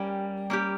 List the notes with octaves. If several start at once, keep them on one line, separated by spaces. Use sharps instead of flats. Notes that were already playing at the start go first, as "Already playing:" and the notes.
Already playing: G3 A#3 C#4 G4
A#3 C#4 G4